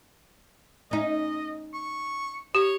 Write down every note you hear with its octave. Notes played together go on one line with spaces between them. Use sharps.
C#4 D#4 D#5
C#6
G4 C#5